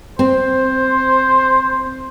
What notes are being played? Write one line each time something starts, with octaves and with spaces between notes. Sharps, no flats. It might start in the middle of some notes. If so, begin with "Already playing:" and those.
C4 C5